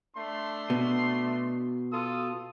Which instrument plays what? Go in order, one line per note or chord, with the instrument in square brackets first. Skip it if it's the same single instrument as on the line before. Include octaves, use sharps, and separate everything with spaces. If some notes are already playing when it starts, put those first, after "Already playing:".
[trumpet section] A3 D4 C6
[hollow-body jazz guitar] B2
[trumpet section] F4 A4 D#6